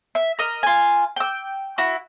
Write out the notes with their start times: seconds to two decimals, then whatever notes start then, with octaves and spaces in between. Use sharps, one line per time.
0.15 E5
0.39 A#4 D#5
0.63 F4 G#5
1.16 G5 E6
1.78 E4 F#4